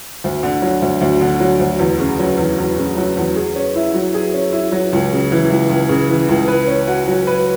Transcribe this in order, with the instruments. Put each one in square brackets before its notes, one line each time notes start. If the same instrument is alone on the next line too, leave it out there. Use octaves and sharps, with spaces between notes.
[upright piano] D2
D3
F#3
D2
D2
D3
F#3
D2
E2
C#3
F#3
E2
E2
C#3
F#3
E2
G#4
C#4
E4
F#3
G#4
C#4
E4
F#3
C#2
C#3
E3
C#2
C#2
C#3
E3
C#2
B4
C#4
F#4
F#3
B4